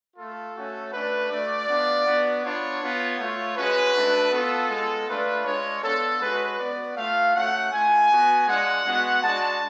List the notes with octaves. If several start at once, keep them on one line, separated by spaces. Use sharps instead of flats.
A3 F4 A4
A3 C#4 F#4
A3 D4 F#4 B4
A3 D4 F#4 D5
B3 D4 F4
B3 D4 F#4
B3 D4 F4 C#5
B3 F4
A3 F4
G#3 C#4 F#4 B4
A3 D4 F#4
B3 F4 A4
G#3 B3 F4
A3 D4 F4 B4
G#3 D4 F4 C#5
B3 D4 F4 A4
G#3 C#4 F#4 B4
B3 F#4 D5
A3 F4 F5
A3 C#4 F#4 F#5
A3 F4 G#5
B3 F#4
G#3 D4 F4 F#5
G#3 B3 F#4
G#3 D4 F#4 A5